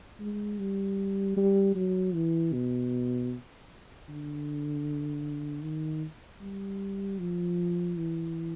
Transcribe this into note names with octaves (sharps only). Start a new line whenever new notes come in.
G#3
G3
G3
F#3
E3
B2
D3
D#3
G3
F3
E3